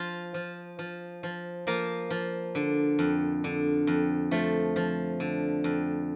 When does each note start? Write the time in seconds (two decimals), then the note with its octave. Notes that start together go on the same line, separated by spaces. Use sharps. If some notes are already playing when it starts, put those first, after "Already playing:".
Already playing: F3 F4
0.34 F3
0.79 F3
1.23 F3
1.67 F3 A#3
2.10 F3
2.55 D3
2.99 F2
3.44 D3
3.87 F2
4.31 F3 A3
4.76 F3
5.20 D3
5.64 F2